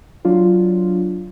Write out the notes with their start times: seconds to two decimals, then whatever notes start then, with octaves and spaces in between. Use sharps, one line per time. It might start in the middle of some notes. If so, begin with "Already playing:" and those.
0.25 F#3 D4 F4